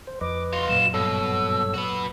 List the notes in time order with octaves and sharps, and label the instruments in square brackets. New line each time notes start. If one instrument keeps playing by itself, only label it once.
[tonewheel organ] C5
[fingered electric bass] F2 [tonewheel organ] B4 D#5 [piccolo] D6
[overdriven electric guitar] F#4 F5 [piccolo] C6
[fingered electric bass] F#2 A#2 F#3 [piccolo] E7
[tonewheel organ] G2 A4 C#5 [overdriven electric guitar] B2 [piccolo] E6
[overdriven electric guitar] F#4 B4